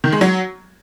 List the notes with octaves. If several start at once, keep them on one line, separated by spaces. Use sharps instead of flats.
D#3
G#3
F#3